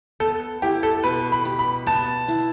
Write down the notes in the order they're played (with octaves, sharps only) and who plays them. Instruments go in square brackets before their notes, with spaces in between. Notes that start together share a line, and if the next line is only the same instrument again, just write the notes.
[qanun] B3 [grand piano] A4
[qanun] E4 [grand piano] G4
[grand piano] A4
[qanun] B2 [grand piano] B4
[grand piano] B5
[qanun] G4
[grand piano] B5
[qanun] B3 [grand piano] A5
[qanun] E4